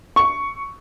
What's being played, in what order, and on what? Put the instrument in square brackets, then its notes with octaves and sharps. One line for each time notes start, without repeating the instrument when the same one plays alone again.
[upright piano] C#6